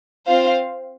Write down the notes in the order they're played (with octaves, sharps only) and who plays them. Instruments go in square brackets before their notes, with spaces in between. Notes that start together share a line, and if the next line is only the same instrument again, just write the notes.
[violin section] C4 F4 C5 F5